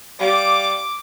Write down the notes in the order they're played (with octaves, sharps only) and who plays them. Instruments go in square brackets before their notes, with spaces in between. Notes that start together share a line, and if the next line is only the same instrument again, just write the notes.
[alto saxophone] G3 [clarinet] F5 [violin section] D6